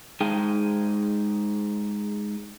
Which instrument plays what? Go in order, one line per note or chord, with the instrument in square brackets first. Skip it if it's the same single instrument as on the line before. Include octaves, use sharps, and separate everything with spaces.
[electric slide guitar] G#3 D#4 G#4 G5